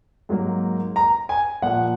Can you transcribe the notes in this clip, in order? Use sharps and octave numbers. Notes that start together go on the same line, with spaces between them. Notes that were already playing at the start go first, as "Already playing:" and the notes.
G#2 F#3 A#3
A#5
G#5
A#2 F3 A#3 F#5